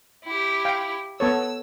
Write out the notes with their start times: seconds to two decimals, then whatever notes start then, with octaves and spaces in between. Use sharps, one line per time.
0.24 E4 G4
0.65 F5 G5
1.20 B3 A4 C#5 E6